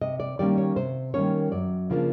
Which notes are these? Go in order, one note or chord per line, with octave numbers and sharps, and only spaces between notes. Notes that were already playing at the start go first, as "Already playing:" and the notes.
C3 D#5
D5
D#3 G3 A#3 C#4 D5
C#5
C3 C5
D#3 G3 A#3 C#4 C#5
F#2 D5
C#3 F3 A#3 D4